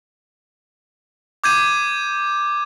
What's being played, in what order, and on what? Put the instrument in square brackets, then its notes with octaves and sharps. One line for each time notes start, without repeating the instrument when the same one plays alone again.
[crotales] D6 G6 G#6 D#7